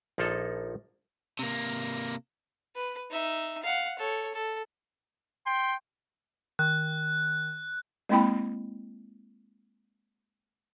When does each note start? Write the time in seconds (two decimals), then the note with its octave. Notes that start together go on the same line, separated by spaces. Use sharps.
0.18 A#1 F3 A#3 D#4 A4
1.39 C3 A#3
2.75 B4
3.11 D#4 E5
3.63 F5 F#5
3.99 A4 C#5
4.34 A4
5.46 G5 C6
6.59 D#3 F#6
8.09 G#3 A#3 C4 E4 G5 B5